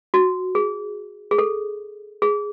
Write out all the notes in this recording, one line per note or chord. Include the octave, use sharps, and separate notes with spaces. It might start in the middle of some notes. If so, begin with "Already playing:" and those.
F#4
G#4
G#4
A4
G#4